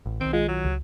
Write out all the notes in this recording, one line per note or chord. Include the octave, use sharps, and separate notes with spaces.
A1
B1 D#3 C4 D7
G#3 F4
F#3
C#2